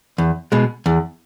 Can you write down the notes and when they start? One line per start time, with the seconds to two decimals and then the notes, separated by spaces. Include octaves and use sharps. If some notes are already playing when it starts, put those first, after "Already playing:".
0.18 E2
0.52 B2 G#3
0.86 E2